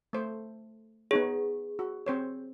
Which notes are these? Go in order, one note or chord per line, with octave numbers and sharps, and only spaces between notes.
A3 C5
B3 D#4 G#4 C#5
F#4
C4 C5 C#5